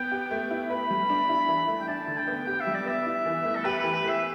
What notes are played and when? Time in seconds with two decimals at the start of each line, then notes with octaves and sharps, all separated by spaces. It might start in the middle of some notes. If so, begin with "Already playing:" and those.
Already playing: B3 G5
0.12 G4
0.31 A3
0.51 E4
0.70 B4 B5
0.91 G3
1.09 D4
1.29 E4
1.49 E3
1.68 A3
1.81 G5
1.88 D4 A5
2.08 D3
2.17 G5
2.28 B3
2.47 G4 G5
2.60 E5
2.67 G3
2.74 D5
2.86 B3 E5
3.06 E4
3.26 E3
3.45 A3
3.55 A4
3.65 G4 B4
3.79 B4
3.84 E3
3.94 B4
4.04 A3 E5